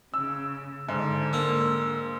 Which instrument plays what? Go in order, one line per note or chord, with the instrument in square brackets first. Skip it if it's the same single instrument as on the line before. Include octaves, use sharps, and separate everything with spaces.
[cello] C#3 [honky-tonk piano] E6
[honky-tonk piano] G#2 [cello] D3
[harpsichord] A#3 [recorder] E6